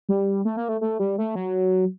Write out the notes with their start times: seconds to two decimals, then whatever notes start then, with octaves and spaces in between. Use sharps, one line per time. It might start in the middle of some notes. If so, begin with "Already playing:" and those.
0.09 G3
0.45 A3
0.57 A#3
0.69 A3
0.81 A3
0.99 G3
1.18 A3
1.35 F#3